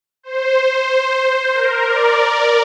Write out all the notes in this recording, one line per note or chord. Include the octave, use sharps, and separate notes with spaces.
C5
A#4
D5